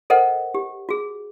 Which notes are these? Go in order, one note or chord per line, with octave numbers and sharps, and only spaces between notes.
A4 A#4 C5 D#5 F#5
G4
F#4 G#4